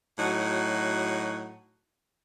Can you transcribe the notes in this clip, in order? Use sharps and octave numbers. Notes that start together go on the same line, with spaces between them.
A2 F#3 D#4 F#4